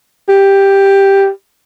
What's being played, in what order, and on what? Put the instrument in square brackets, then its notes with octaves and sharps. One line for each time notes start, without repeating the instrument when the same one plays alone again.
[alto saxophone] G4